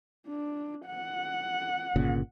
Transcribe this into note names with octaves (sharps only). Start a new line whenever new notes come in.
D4
F#5
G1 A#2 C#3